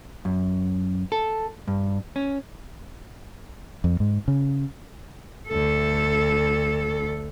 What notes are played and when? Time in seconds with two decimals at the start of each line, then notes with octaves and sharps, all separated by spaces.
0.25 F#2
1.12 A4
1.68 G2
2.16 C#4
3.84 F2
4.00 G#2
4.28 C#3
5.49 D2 A4